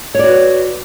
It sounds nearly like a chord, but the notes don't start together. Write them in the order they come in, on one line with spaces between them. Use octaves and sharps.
C#5 D5 F#4 B4